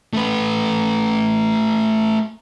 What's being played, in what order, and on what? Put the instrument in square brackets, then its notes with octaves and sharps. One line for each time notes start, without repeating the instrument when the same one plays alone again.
[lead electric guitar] A3 B4